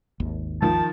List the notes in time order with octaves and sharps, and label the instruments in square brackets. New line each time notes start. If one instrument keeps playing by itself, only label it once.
[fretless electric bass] G#1 D#2
[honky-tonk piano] D#3 F3 [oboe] A5